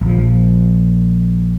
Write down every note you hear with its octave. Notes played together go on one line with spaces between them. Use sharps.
A#1 F3